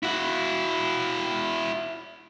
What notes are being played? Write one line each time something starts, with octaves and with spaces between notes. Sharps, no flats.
E4 F#4